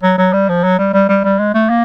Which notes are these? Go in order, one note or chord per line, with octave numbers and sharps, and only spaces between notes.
F#3
F#3
G3
F3
F#3
G3
G3
G3
G3
G#3
A3
A#3